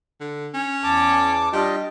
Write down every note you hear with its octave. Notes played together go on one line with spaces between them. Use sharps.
D3
C#4
E2 A5 D6
G3 D4 F4 D#5